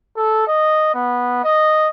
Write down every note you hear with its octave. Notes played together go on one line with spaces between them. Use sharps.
A4
D#5
B3
D#5